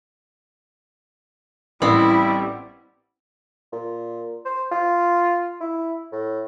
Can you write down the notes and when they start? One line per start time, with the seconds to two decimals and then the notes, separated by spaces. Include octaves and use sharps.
1.82 A1 G3 B3 C4 E4
3.72 A#2
4.45 C5
4.71 F4
5.60 E4
6.12 A2